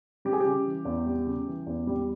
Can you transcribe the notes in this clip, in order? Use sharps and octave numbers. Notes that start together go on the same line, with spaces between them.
G3 G4
G#4
C#3 G4
E3
E2
G3
C#3
E3
E2
G3